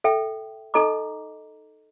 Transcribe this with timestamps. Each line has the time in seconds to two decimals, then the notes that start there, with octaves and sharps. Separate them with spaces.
0.04 A4 E5 G5
0.74 D#4 A4 D#5 A#5 D6